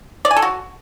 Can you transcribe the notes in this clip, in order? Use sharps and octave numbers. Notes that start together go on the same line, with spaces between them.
D5
G#5
A4
F#4